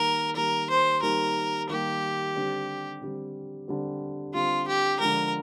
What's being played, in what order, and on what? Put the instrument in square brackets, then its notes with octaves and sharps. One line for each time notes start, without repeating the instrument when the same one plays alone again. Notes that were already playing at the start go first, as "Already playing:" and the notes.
Already playing: [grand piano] D#3 G3 A#3 [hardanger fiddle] A#4
[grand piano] D#3 G3 A#3 [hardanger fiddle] A#4
[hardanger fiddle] C5
[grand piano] D#3 G3 A#3 [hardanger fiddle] A#4
[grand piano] D#3 G3 A#3 [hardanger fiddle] G4
[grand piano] D3 G3 C4
D3 G3 C4
D3 G3 C4
[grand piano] D3 G3 C4 [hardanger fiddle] F4
[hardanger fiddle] G4
[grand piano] D3 F3 G#3 [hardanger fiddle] A#4